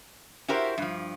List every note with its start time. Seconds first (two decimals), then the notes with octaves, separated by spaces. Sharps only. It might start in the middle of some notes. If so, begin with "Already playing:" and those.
0.48 E4 F#4 G4 A#4 C5
0.78 G2 F3